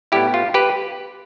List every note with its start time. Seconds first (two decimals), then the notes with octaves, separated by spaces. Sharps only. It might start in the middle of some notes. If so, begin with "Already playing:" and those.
0.12 A2 G3 B3 E4 G4
0.34 F4
0.54 G4 B4